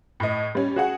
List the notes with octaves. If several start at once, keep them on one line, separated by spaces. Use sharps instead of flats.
A2 D#5
G3 C#4
F#4 G#4 F#5